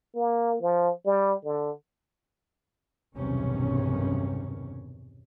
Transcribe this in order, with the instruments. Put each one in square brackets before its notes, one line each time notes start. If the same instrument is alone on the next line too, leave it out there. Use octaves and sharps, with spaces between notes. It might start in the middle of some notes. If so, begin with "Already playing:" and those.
[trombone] A#3
F3
G3
D3
[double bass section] B1 E2 G2 C3 D#3 C#4